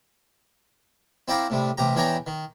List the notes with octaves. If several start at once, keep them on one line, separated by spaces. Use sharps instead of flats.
C4 E4 D5 F5 G5 A#5
A2 C3 G3
A1 C3 G4 A#5
E2 E3 D4 C#5 G5 A#5
D#3